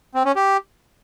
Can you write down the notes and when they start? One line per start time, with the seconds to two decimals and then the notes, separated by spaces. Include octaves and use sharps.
0.15 C4
0.25 C#4
0.36 G4